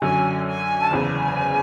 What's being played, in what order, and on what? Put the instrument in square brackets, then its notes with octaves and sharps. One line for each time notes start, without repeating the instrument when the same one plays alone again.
[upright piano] F#2 D3 F#3 C#4 [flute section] G#5
[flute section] G#5
A5
[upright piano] F#1 E2 C#3 [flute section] G#5